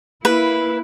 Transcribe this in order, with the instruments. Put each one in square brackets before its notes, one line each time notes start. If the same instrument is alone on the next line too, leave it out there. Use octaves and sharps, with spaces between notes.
[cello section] A#3 E4 [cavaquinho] B4